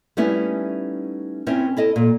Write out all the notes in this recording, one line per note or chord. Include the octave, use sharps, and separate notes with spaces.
G3 A3 B3 C#4 D#4 E4
C4 C#4 E4 A#4 C5
E4 A4 D#5
A#2